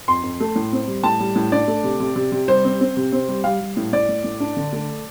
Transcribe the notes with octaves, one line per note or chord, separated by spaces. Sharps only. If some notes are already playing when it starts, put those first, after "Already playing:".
F2 C6
F2
A3
A2
C4
G3
A2 A5
G3
A2
D4 D5
A3
C3
C3
C3
C3
G3 C5
C4
C4
C3
C4
G3
G3 F5
G3
A2
A2 D5
A2
A2
D4
D3
A3